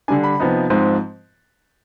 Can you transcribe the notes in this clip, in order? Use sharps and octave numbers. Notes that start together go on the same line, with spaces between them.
D3 G3 D4 G#5
B5
C3 F3 B3 D#4
G#2 F3 G#3 C4